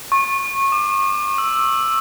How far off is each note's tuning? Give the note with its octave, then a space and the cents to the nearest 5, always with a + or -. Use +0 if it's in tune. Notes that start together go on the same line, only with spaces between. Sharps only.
C#6 -25
D6 +25
E6 +5